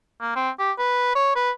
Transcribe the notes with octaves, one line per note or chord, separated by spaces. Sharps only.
A#3
C4
G4
B4
C#5
B4